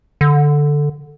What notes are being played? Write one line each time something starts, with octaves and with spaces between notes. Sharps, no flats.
D3